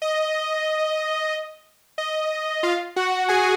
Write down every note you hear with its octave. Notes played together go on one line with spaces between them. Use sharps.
D#5
D#5
F4 F5
F#4 F#5
G#4 G#5